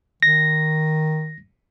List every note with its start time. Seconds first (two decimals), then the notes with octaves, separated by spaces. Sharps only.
0.23 D#3 A#6